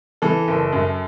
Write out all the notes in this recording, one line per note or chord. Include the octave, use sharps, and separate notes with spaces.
E3 A4
F#1
F#2